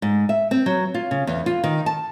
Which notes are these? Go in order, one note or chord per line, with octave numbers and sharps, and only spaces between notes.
G#2
E5
C4
F#3
F4
C#3
E2
F4
D#3
A5